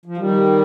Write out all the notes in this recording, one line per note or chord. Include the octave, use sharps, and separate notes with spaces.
F3
D#3 G3